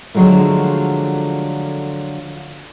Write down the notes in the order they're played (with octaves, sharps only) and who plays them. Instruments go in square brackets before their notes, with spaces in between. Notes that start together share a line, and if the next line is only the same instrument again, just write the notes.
[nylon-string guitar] D3 F3 F#3 G#3 A3